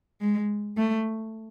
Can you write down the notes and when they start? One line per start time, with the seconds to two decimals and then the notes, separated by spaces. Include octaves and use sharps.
0.21 G#3
0.77 A3